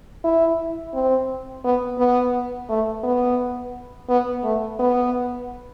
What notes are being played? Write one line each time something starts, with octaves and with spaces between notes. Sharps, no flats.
E4
C4
B3
B3
A3
B3
B3
A3
B3